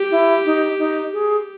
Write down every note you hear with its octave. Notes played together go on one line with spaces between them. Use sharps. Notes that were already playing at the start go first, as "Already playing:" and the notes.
Already playing: G4
E4
D#4
D#4
G#4